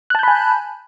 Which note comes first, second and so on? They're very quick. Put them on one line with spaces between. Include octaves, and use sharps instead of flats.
F#6 A5 G6 B5 G#5